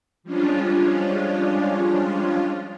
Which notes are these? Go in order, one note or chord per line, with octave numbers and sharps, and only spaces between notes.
F3 G3 G#3 C#4 D4 F4